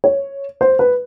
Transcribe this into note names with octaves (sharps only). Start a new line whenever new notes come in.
C#5
C5
B4